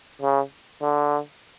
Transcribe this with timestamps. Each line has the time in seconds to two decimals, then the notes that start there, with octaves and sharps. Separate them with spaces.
0.22 C#3
0.82 D3